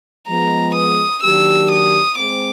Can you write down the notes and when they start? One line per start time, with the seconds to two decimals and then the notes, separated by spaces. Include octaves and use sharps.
0.28 F3 G#3 B3 A#5
0.75 D#6
1.23 D#3 F#3 A#3 D4 G4 E6
1.72 D#6
2.18 G#3 C4 D6